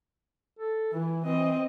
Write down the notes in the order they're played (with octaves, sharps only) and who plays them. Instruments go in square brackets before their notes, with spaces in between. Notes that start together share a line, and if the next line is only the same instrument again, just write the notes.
[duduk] A4
[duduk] E3 [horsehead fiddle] E4
[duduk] E3 [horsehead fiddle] C4 D#5